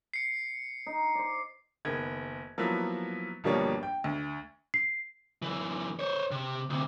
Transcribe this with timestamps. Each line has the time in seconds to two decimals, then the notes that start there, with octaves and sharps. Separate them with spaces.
0.14 C7 C#7
0.87 D#4
1.15 C5 D5
1.85 F#1 D#3 B3 G#6
2.58 F3 F#3 A#3 B3 E4
3.44 G1 B2 F3 G3 A#3 C#5
3.83 G5
4.04 D2
4.74 C7
5.42 F#2 E3
5.99 C5 C#5
6.31 C3
6.70 D2 C3